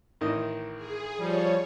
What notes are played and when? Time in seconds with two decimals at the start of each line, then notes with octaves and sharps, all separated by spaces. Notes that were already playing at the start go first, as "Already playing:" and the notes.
0.21 A1 D#3 D#5
0.75 G#4
1.18 F3 G3 C#5